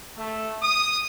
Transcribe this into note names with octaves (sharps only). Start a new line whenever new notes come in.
A3
D#6